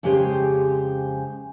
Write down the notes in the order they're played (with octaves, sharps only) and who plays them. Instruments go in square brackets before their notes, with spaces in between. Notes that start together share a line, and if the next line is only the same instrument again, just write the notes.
[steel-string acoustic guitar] F2 C#3 G#3 G4 C5 G#5